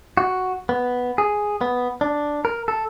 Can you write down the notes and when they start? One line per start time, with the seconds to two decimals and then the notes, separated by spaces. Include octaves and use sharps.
0.17 F#4
0.69 B3
1.18 G#4
1.61 B3
2.01 D4
2.45 A#4
2.68 A4